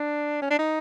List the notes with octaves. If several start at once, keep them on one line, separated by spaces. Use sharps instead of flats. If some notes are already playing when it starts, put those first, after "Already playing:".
Already playing: D4
C#4
D4
D#4